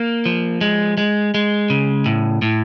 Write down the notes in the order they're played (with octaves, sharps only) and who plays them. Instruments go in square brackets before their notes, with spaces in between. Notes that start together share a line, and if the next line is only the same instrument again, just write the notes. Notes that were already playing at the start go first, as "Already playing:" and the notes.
Already playing: [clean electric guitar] A#3
F3
G#3
G#3
G#3
C#3
A2
A2